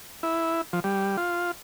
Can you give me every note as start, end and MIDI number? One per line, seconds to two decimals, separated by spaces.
0.23 0.61 64
0.73 0.80 53
0.84 1.17 55
1.17 1.51 65